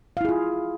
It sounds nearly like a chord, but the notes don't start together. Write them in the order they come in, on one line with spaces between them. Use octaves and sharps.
F5 E4 G#4 F4